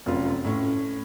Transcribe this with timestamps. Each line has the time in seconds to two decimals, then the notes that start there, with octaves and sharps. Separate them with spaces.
0.06 F1 F#2 F4
0.44 A2 C#4